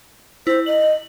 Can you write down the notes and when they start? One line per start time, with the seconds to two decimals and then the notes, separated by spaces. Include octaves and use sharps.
0.47 E4 C5
0.66 D#5 F#7